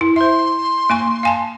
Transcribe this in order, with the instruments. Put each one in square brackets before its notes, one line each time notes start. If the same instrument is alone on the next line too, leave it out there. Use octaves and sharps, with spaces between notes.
[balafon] E4
[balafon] C5 E5 [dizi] C6
[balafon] A#3 G#5 C#6
F5 G#5 A5